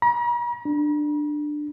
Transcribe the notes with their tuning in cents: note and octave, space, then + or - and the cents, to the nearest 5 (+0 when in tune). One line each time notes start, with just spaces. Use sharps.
A#5 +45
D4 +15